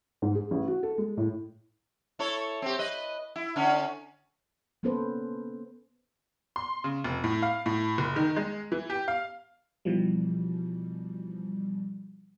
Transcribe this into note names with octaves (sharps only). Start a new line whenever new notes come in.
G#2
G#4
A1
F#4
A4
G#3
A2
E4 A4 C#5
C4 G4
B4 D#5
E4
D3 C#4
A#3 B3 C#4 A4 B4 C5
C6
C#3
F1
A2
F5
A2
F#1
D#3
G#3
E3
G4
F5
B2 E3 F3 G3